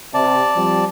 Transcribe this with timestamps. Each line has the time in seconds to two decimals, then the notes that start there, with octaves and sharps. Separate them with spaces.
0.14 C3 D5 A5
0.55 F3 G3 C4